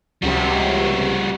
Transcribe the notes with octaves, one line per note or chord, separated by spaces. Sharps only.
C#2 C3 G3 F#4